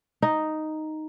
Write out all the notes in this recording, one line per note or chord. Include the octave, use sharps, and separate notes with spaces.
D#4